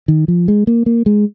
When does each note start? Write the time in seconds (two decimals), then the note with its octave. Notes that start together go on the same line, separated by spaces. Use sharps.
0.08 D#3
0.28 F3
0.48 G#3
0.67 A#3
0.86 A#3
1.06 G#3